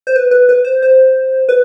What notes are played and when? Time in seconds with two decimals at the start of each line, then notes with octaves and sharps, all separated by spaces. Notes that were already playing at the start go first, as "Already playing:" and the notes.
0.07 C5
0.16 B4
0.31 B4
0.49 B4
0.65 C5
0.82 C5
1.49 B4